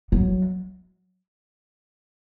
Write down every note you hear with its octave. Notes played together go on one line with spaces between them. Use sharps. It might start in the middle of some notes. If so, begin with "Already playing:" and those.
F#3